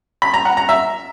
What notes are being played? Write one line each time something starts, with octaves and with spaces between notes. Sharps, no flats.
B5
A#5
F#5
A#5
E5